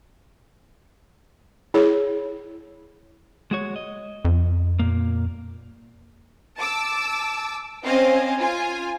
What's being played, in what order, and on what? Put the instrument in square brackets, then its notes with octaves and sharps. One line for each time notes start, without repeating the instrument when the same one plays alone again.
[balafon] E4 G#4 C#5
[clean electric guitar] G#3 F#4 C#5
D#5
[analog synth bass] F2
[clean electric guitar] A#2 A#3
[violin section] A5 D6 E6
C4 C#4 C5 D#5 F5 G#5
F4 G#5